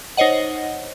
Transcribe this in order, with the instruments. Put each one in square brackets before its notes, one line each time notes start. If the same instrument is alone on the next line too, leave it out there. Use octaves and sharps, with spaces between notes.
[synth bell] D#4 C5 C#5 D#5 F#5